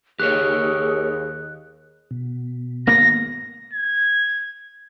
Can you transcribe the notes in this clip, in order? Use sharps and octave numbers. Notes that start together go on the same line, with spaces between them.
D#2 G4 G#4 A#4 C#5 F#6
B2
G#1 A#3 B3 A#6
G#6